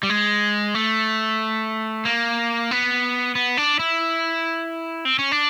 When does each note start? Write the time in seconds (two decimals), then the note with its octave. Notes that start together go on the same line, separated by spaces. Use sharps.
0.03 G3
0.10 G#3
0.75 A3
2.05 A#3
2.71 B3
3.35 B3
3.57 D4
3.79 E4
5.05 C4
5.19 C#4
5.32 D4